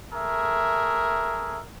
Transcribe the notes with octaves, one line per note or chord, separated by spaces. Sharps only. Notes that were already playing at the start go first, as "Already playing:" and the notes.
A3 G#4 A#4 E5